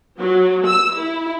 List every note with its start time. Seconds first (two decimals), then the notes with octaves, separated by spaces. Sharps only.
0.18 F#3
0.66 E6
0.97 E4